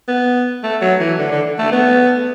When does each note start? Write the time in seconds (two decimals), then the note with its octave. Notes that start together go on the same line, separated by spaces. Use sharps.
0.08 B3
0.63 A3
0.81 F#3
1.00 E3
1.18 D3
1.31 D3
1.59 A3
1.72 B3